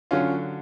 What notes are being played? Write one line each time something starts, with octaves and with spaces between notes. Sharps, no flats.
D3 F#3 C#4 F4